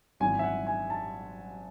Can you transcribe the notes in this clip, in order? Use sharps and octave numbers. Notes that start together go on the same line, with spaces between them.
G#1 F#2 E3 G#5
E5
F#5
G#5
A5